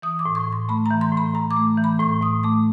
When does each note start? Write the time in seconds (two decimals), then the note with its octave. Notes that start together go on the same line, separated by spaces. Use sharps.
0.02 E3 D#6
0.19 D6
0.25 A2
0.35 C#6
0.47 A2
0.53 C6
0.69 A3 B5
0.86 A#5
0.91 E3
1.01 C6
1.12 A2
1.17 B5
1.34 A2 A#5
1.51 D6
1.57 A3
1.78 E3
1.84 B5
1.99 A2 C#6
2.22 A2 D#6
2.44 A3 D6